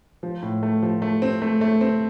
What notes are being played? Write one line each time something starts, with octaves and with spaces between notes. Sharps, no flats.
F3
A2
A3
F3
A3
C4
A3
A3
C4